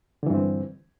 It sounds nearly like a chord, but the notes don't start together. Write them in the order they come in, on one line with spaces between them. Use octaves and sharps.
D3 E3 G2 C4